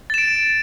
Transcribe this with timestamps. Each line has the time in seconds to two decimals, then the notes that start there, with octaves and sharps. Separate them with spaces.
0.10 A6
0.14 E7
0.18 D7